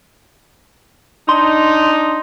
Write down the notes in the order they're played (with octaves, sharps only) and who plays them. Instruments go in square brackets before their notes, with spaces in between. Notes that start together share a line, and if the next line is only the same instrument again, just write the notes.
[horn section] D4 D#4 [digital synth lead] C6